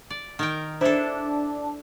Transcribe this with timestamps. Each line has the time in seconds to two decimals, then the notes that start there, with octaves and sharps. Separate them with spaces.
0.10 D5
0.39 D#3 A#4 G5
0.81 D4 E4 A4 C5